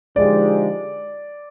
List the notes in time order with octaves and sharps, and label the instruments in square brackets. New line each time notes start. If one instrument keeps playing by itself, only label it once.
[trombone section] D3 F3 G#3 D#4 G4 [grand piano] D5